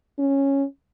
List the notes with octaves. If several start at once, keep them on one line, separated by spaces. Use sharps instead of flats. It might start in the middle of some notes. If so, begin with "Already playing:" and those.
C#4